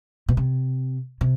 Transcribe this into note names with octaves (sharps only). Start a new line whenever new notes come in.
B2
C3
C3